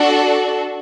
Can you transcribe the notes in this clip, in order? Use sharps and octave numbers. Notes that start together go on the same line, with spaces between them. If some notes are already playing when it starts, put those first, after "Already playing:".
Already playing: D4 F#4 A4